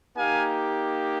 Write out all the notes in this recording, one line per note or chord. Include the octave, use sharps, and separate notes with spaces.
A#3 D#4 G4 F5 G#5